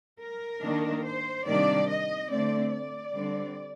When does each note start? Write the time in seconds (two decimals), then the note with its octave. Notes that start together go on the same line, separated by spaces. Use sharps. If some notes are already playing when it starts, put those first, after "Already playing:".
0.19 A#4
0.61 D#3 A#3 D4
1.03 C5
1.45 C3 D#3 G3 A#3 D4 D5
1.87 D#5
2.29 D3 A3 C4 D5
2.71 D5
3.13 D3 G3 C4